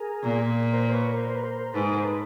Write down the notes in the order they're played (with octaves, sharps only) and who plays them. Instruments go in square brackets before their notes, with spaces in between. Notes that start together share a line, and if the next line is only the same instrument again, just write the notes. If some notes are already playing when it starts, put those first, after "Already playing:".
Already playing: [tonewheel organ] G#4 A#4
[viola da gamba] A#2
[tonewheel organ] A#4 C5
C5
B4 C#5
A#4 C5
B4
A#4 C5
[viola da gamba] G#2 [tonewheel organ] A4 B4
[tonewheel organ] C5
A4 B4